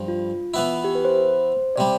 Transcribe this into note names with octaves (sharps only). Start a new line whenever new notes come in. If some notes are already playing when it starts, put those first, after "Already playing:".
Already playing: G2 F3
F4
E3 B3 E4
G4
B4
C5
C3 G3 D5